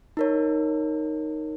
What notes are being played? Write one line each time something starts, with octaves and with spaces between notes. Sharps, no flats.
D#4 A#4 C#5